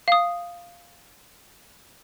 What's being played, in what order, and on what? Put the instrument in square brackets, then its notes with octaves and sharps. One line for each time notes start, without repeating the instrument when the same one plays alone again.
[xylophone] F5 D#6